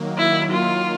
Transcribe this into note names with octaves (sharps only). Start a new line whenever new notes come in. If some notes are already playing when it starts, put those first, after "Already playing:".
Already playing: D#3 F#3 A#3
E4
F4